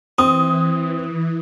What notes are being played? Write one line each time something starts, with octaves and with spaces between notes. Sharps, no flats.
E3 C4 D#6